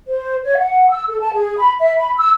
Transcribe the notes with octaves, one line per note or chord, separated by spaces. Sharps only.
C5
C#5
F#5
E6
A4
A5
G#4
B5
E5
B5
E6